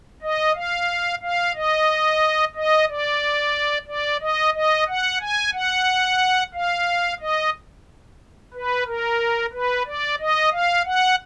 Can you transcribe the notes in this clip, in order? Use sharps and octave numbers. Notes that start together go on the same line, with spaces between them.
D#5
F5
F5
D#5
D#5
D5
D5
D#5
D#5
F#5
G#5
F#5
F5
D#5
B4
A#4
B4
D5
D#5
F5
F#5